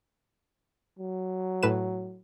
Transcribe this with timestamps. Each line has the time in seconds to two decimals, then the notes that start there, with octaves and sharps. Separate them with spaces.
0.99 F#3
1.63 A2 B4 E7